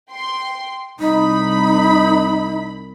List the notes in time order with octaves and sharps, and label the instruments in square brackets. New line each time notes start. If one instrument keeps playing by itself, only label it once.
[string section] G5 C6
[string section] C2 B5 [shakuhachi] D#4